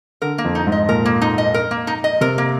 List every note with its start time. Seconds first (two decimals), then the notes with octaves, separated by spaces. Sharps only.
0.22 D3 A#4
0.38 A#3
0.44 F2
0.55 D#4
0.67 G#2
0.72 D#5
0.89 A#2 A#4
1.05 A#3
1.21 D#4
1.38 D#5
1.54 A#4
1.71 A#3
1.87 D#4
2.04 D#5
2.21 C3 A#4
2.38 A#3